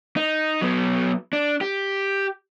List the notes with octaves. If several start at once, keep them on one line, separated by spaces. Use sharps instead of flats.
D#4
F#3 B3
D4
G4